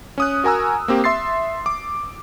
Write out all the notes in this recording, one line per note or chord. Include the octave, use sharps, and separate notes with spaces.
C#4 D#6 F#6
F#4 A#4 G#5 A#5 E6
A#3 C4 G4
E5 C6 A6 C7
D6